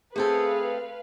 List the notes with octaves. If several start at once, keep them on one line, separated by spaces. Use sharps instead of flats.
A3 C4 G#4 A4 B4 F5